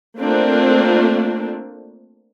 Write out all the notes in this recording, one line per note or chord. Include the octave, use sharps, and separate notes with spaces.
A3 A#3 C4 D4 F4